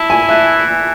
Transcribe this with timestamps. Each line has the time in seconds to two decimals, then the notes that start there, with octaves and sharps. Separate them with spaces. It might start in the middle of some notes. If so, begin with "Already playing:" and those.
Already playing: E4 A5
0.10 G#5
0.29 E3 E5